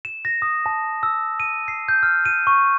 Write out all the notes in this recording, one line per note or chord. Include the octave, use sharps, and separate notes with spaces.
E7
A#6
D#6
A5
E6
D#7
C7
G6
F6
D#7
C#6